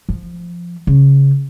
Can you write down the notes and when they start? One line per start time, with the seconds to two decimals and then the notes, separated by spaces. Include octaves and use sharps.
0.09 F3
0.87 C#3